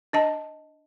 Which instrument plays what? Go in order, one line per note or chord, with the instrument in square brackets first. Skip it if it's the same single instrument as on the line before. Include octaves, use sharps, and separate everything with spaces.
[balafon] D4 D#5 A5